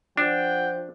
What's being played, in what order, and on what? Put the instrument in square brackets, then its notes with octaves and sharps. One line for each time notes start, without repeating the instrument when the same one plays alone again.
[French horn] F3 [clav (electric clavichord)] D4 [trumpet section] F#5 G5